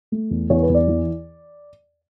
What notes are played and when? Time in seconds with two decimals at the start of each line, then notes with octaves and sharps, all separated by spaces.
0.12 A3
0.31 E2
0.50 E2 C#5
0.63 B4
0.69 E2
0.74 D5
0.88 E3